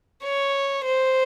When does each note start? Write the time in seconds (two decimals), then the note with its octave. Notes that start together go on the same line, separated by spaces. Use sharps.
0.24 C#5
0.85 C5